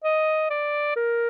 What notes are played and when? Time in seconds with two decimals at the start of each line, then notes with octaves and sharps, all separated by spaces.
0.04 D#5
0.50 D5
0.96 A#4